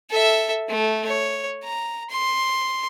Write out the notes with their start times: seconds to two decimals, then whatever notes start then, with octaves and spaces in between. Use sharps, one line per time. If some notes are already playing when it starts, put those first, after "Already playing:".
0.10 A4 E5
0.69 A3
1.06 C#5
1.64 A#5
2.10 C6